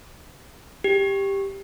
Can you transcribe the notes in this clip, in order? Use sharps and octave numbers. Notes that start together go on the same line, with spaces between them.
G4